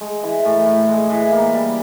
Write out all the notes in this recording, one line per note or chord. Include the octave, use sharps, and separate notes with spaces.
G#3
E3
A2
A2
G#3
E3
A#3
G3